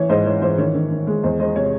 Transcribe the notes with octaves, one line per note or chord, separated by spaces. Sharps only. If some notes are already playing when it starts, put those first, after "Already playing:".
Already playing: E3 C#5
G#2 C5 D#5
E3 C#5
E3 C5
D#3 C#5
D#3
D#3
G#3
E2 C5 D#5
G#3 C5 D#5
C3 C#5